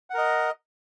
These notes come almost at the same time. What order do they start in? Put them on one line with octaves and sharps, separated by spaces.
F#5 A#4 D#5